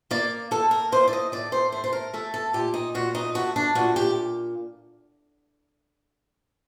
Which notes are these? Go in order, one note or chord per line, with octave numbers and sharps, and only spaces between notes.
A#3 D5
A#3 A4
A#4
A2 C5
D5
D#5
A2 D5
C5
A3 C5
C5
A#4
A3 A4
A4
A#2 G4
D#4
A#2 F#4
D#4
A3 F#4
D4
A#2 F#4
G4